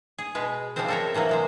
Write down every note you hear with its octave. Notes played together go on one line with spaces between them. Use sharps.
G#4
B2 G#3 B4
C#3 F3 G3 G#3 C4 C5
C4 A4 A#4 C#5 E5
C3 E3 F#3 A#3
C3 G#3 C5